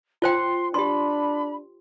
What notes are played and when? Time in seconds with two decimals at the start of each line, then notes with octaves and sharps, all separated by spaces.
0.22 F4 C5 G5 C6
0.74 D4 G4 B5 C6